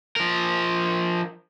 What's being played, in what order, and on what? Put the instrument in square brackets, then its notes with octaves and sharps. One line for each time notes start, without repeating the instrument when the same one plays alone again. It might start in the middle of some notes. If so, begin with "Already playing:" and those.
[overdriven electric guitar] F3 A#4